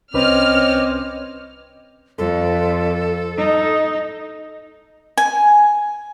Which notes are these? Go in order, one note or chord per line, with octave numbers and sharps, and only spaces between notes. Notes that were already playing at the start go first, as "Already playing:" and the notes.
C2 C4 C#4 B4 C#5 D#5 D6 F6
F2 A4
D#4
G#5